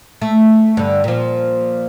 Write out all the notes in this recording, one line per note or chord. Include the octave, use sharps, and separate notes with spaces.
A3
G2 D3
A#2 F3